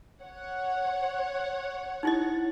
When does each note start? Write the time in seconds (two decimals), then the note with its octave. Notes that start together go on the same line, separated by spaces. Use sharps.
0.22 C#5 F#5
2.03 D#4 E4 D#5